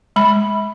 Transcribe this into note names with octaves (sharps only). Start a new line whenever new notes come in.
G#3 B5